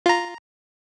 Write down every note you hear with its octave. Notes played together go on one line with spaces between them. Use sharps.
F4 A#5